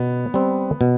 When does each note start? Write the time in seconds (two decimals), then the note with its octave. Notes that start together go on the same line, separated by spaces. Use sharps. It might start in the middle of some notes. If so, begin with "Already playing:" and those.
Already playing: B2 B3
0.34 G3 C4
0.81 B2